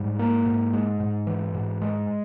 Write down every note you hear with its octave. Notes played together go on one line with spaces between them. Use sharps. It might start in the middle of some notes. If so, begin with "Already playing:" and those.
Already playing: G#2 G3
A#3
G#2
G#3
G#2
E3
G#2
G#3